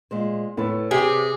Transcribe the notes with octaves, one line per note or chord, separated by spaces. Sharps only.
A#2 G#3 C5
A2 B4 C#5 A5
C3 G4 G#4